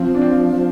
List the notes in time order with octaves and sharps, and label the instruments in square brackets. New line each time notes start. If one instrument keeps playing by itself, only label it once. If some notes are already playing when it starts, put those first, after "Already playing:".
Already playing: [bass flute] F3 [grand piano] C4
[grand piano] D4
C4